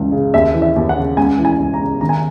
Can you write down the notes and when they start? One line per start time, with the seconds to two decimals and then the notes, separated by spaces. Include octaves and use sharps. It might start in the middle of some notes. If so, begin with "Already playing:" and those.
Already playing: C#2 E3
0.12 C#3
0.34 D#2 E5
0.54 E3
0.62 E5
0.76 D#2
0.89 F#5
0.96 C#3
1.17 C#2 G#5
1.38 E3
1.45 G#5
1.59 C#2
1.74 A#5
1.80 C#3
2.01 D#3 A#5
2.09 G#5